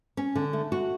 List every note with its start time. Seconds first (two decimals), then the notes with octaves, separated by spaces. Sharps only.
0.17 C#4
0.35 D3
0.53 A3
0.72 F#4